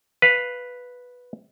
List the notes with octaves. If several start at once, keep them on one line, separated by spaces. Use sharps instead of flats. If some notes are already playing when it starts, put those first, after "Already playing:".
B4 F5